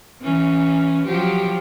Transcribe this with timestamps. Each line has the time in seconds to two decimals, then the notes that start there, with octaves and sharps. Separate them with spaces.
0.22 E3 C#4
1.06 F3 F#3 G4